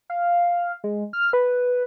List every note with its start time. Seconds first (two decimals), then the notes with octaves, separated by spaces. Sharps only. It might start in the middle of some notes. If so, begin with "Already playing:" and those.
0.10 F5
0.84 G#3
1.13 F6
1.33 B4